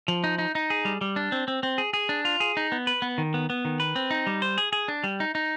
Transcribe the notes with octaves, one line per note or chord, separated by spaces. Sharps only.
F3
D#4
D#4
D#4
G#4
G3
G3
D4
C4
C4
C4
G#4
G#4
D4
F4
G#4
D#4
B3
B4
B3
D#3
B3
B3
D#3
B4
C4
D#4
G3
C5
G#4
G#4
D4
G3
D#4
D#4